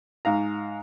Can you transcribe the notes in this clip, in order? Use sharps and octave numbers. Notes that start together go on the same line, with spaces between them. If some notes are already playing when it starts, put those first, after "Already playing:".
G#2 F5 A#5